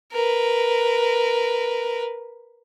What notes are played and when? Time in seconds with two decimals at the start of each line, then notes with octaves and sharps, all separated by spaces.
0.12 A#4 B4